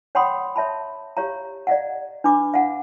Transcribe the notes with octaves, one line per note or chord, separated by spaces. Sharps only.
C#5 F#5 G5 B5 C6 D#6
C#5 E5 A5 B5
G4 C#5 F5 A#5
D5 D#5 F5 F#5
D4 B4 B5 D6
F5 F#5